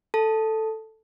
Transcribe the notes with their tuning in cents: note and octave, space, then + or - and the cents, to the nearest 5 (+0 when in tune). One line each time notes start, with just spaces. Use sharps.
A4 +0 A5 +0